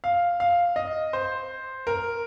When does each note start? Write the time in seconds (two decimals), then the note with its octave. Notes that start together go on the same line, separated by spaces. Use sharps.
0.04 F5
0.40 F5
0.76 D#5
1.13 C5
1.87 A#4